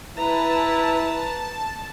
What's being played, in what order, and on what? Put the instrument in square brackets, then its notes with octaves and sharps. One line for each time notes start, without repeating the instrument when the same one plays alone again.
[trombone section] E4 [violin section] B4 [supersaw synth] A5 [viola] A#5